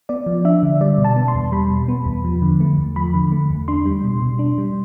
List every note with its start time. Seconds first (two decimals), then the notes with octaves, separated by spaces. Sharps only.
0.09 B3 D5
0.26 F3
0.45 D4 E5
0.63 D3
0.81 G3 D5
0.98 B2
1.05 A5
1.16 B3
1.28 C6
1.35 E2
1.52 G3 B5
1.70 B2
1.88 B3
2.06 E2
2.24 F3
2.42 D3
2.60 A3
2.78 E2
2.96 F3 B5
3.14 D3
3.32 A3
3.50 E2
3.68 D4 C6
3.86 G3
4.04 B2
4.22 B2
4.39 D4
4.58 G3